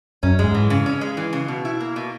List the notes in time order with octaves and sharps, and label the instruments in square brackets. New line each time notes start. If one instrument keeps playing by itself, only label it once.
[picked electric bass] F#2 [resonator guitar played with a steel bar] C#4
[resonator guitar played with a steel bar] G#3
[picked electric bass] G#2
[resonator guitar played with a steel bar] E3
C#3
C#4
G#3
E3
C#3
B2
E4
A#3
B2